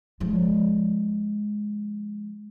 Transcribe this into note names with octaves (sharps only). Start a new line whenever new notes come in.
F3 G#3